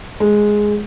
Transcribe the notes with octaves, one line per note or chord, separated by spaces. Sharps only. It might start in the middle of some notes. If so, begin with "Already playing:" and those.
G#3